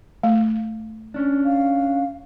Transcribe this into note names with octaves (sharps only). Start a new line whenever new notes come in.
A3
C#4 D4
F5